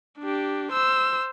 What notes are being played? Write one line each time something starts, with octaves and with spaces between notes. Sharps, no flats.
D4 G4
C5 E6